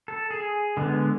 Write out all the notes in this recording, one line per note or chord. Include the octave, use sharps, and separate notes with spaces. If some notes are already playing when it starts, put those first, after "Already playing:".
A4
G#4
D3 G#3 B3